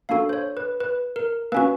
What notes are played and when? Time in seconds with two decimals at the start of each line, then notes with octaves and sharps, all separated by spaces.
0.09 A#3 D4 F#4 A4 F5
0.29 C5
0.33 C#5
0.57 B4
0.80 B4
1.16 A#4
1.52 A#3 C#4 F#4 B4